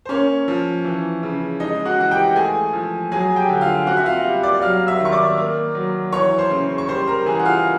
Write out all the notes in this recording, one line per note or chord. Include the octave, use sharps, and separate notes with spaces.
C5
A#3 C#4 C#5
F3
E3
C#3
G#3 D#4 D#5
F#4 F#5
E3 F#5
G4 G5
A3 G#4 G#5
F3
F#3 G#4 G#5
G4 G5
D3
F4 F5
C4 F#4 F#5
E5
F4 F5
G3
D5 D6
F#3 F5 F6
E5 E6
D#3 C#6
D5 D6
A#3
F#3
E3 C#5 C#6
C5 C6
C#3
C#6
G3 C5 C6
A#4 A#5
E3 G#4 G#5
F#5
F4 F5